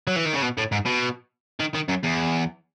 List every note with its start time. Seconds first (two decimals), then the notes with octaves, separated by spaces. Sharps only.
0.07 F#3
0.16 E3
0.25 D#3
0.34 C#3
0.42 B2
0.57 A2
0.72 G#2
0.86 B2
1.60 D#3
1.74 D#3
1.88 F#2
2.03 E2